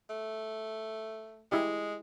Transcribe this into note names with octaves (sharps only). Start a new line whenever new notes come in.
A3
G#3 E4 G4